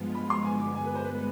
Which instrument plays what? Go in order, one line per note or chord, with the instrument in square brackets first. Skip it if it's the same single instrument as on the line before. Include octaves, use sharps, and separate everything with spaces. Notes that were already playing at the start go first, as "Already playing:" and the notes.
Already playing: [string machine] G2 F3 G#3 B3 F4
[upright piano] B5
C6
[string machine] G2 D3 G#3 B3 [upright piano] G#5
[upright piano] D6
G#5
B4
C5
B4
B4